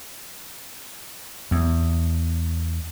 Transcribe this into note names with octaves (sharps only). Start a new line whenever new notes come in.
E2